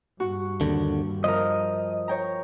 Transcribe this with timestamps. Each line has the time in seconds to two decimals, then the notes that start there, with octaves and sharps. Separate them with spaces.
0.20 G2 F#4
0.61 D#2 D3
1.24 F3 A#4 D#5
2.08 C#5 G5 A#5